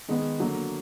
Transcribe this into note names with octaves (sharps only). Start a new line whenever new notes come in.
D#3 G#3 B3
D3 F#3 A#3